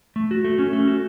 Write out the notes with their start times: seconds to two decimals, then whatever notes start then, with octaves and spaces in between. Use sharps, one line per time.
0.16 A3
0.31 F#4
0.44 A3
0.59 C#4
0.73 A3
0.87 F#4